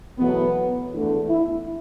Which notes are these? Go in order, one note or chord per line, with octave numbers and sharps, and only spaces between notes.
E2 B2 F#3 A3 B3
E2 D3 A3
E4